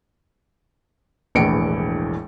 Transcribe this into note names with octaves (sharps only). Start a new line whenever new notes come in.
E1 A#1 A2 E3 C#7 D7